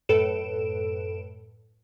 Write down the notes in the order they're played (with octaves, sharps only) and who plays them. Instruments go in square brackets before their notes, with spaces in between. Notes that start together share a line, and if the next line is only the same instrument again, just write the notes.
[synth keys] F#2 A2 A4 B4 D7 E7